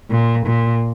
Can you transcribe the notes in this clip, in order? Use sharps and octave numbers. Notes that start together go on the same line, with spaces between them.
A#2
A#2